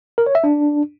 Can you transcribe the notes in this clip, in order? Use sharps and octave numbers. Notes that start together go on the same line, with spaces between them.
A#4
C#5
E5
D4